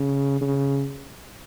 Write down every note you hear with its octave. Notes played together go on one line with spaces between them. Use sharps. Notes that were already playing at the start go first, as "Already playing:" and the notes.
Already playing: C#3
C#3